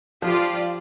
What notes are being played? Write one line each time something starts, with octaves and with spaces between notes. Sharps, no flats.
F3 F4 G4 D5